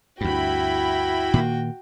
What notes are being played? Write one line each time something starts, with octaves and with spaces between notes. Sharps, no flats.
D2 G2 E4 F#4 G5 B5
A#2 D#3 A#3